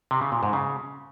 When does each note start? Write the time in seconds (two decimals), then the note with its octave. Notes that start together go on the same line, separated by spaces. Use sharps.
0.11 C3
0.21 C#3
0.32 A#2
0.43 G#2
0.53 C#3